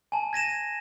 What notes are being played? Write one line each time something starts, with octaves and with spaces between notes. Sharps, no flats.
G#5 A5
G#6 A#6 D#7 E7